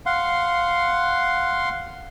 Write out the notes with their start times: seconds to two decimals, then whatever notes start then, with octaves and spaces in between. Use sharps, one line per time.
0.06 F5 F#5 C6